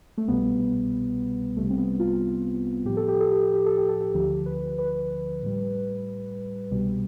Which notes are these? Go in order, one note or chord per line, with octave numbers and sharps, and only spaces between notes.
A3
C2 B2 G3 B3
C2 C3 G3 A3
C4
B3
F4
A2 F3 G4
A4
G4
A4
G4
A4
G4
A4
G4
A4
G4
D2 D3 F3 G4
B4
B4
A2 G3
C2 B2 G3